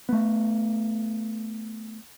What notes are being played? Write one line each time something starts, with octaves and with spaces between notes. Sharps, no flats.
A3 B3